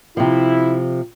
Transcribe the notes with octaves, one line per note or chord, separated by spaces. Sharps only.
C3 F3 E4